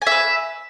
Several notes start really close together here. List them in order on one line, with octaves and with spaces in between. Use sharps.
G#5 E5 B4